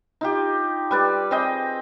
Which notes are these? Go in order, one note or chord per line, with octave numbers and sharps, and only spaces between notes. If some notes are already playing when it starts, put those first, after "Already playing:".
D#4 F4 G4
G3 B4 D5
C4 G#4 D#5 G5